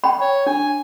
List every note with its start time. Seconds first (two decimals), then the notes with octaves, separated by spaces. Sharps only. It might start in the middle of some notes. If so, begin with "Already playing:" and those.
0.04 G5 B5
0.21 C#5
0.47 D4 G#5